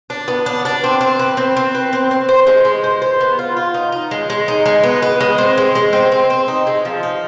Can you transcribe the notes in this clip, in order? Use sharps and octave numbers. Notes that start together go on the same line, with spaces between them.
D4
B3
D4
D4
C4
C4
B4
C4
C4
B4
C4
C4
C5
G#3
G#3
C5
C5
B3
F4
F4
D#4
D#4
G#3
G#3
D#4
G#3
B3
B3
G#3
C4
G#3
G#3
C4
C4
C4
D#4
G#3
F3
D#4